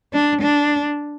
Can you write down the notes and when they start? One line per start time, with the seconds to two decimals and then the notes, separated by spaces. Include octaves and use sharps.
0.13 D4
0.41 D4